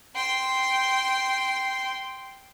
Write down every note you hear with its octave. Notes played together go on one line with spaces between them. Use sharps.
G5 C6